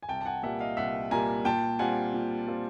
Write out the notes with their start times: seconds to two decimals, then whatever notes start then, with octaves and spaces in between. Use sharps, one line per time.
0.03 G#5
0.09 C2 G5 A5
0.21 A5
0.26 F#5 G#5
0.43 A#2 G3 A#3 E5 F#5
0.60 D#5 F5
0.77 C2 E5 F#5
1.11 A#2 G3 A#3 G#5 A#5
1.45 A#2 G5 A5
1.79 G3 C4 F4 F#5 G#5
2.14 A#2
2.48 G3 C4 F4